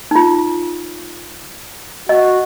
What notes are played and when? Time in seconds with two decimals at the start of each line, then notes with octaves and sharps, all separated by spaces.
0.11 D#4 F4
2.09 F#4 D#5